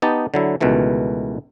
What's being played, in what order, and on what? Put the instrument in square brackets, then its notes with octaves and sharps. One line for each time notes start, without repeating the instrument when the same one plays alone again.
[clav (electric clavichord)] B3 D#4 G4 A5
D3 F#3 E4
C#2 B2 D#3 E3 A3